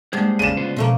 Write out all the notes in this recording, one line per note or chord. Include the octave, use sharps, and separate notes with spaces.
G3 G#3 A#3 D4 G4 G#4 C5
C#3 D5 D#7 E7
B3 F4 C5
B2 F3 A3 A#3